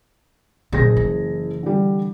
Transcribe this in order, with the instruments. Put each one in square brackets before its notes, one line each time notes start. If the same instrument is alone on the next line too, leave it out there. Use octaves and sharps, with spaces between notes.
[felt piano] F#1 G#4 A#6 [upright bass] A#2
[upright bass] E3
[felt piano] D3 G3